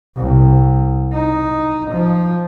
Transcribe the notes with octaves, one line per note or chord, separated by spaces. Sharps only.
C2
D#4
F3